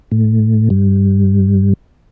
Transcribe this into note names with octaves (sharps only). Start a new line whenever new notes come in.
A2
G2